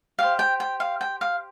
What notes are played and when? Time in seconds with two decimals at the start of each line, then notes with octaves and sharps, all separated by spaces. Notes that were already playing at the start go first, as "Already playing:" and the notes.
0.19 G4 C5 F5
0.39 G5
0.60 G5
0.80 F5
1.01 G5
1.21 F5